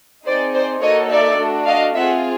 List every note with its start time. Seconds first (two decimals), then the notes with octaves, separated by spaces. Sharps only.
0.25 C4 D#4 G#4 C5 D5
0.54 C5 D5
0.81 A#3 D#4 F#4 A4 C#5 D#5
1.10 D5 E5
1.38 A3 D4 F#4
1.66 D#5 F5
1.95 C4 F4 G#4 E5 F#5